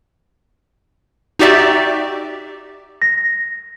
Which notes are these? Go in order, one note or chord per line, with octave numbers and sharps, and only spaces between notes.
D#4 F#4 G4 D5 E5
A#6